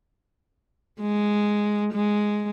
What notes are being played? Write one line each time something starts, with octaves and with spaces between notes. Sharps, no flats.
G#3
G#3